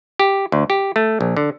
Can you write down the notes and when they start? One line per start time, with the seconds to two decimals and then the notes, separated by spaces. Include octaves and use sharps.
0.19 G4
0.52 D2
0.70 G4
0.96 A3
1.21 A#1
1.37 D3